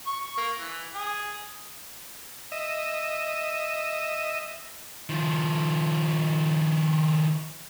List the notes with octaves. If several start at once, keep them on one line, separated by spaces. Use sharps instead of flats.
C#6
A#3
E3
G#4
D#5 E5
D#3 F3